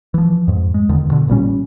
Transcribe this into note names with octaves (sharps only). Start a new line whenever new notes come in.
E3 F3
F2 G#2
G#3
E2 D3 D#3
B2 D3
A1 A#2 G3 C#4